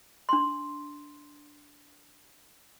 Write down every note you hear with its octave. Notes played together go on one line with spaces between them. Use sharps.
D4 C6